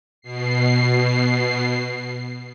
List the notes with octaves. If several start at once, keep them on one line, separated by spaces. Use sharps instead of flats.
B2 C7